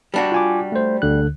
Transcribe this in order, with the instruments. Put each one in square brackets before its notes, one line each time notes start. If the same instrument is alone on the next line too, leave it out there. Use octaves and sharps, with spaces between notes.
[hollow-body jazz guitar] G3 D4 F#4
[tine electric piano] F4 G#5 D6
A3 C5
D2 D3 F#6